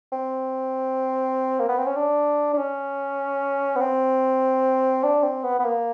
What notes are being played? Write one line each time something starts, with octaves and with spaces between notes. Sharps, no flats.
C4
A#3
B3
C4
C#4
D4
D4
C#4
B3
C4
D4
C4
B3
B3
A#3